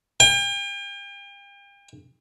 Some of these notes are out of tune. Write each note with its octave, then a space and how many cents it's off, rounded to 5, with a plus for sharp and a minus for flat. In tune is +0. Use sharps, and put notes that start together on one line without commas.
G5 +40